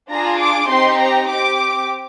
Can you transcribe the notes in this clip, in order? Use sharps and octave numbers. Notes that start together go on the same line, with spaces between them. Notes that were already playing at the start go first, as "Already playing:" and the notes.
D4 F4 G#4 A#5
D6
C4 D#4 G4 C6
A#5
C4 G4 D6